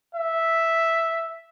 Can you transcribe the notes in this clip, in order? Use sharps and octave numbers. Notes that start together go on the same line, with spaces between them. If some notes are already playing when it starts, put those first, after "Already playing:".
E5